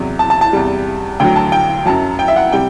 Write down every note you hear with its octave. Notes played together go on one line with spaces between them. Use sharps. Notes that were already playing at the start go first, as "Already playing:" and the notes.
Already playing: E2 C3 F#3
A5
A5
A5
E2 C3 G3
D2 D3 F#3 G5
A5
G5
F#2 F#3 A5
G5
E5
F#5
C3 G3 G5